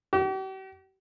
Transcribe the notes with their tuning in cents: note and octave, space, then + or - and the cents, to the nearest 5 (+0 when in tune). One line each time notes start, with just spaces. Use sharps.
G4 -45